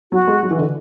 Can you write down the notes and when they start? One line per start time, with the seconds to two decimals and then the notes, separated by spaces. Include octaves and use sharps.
0.12 F#3 F#4
0.27 G#3
0.43 F#3
0.51 E3
0.58 D3